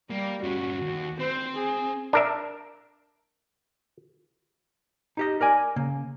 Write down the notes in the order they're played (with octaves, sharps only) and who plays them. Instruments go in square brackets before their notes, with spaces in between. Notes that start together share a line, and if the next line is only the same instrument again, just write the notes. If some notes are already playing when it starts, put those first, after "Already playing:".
[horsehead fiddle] G3 [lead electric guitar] A#3
[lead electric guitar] G2 C#4 [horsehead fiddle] F#4
[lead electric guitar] D#2
[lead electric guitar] C4 [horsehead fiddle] C5
[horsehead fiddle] G#4
[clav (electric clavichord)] D4 A#4 E5
[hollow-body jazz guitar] D#4 G4 D#5
A#4 D5 G#5
C#3 A#3